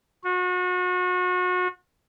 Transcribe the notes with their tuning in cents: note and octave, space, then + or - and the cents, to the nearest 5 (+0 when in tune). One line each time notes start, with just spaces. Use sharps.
F#4 -35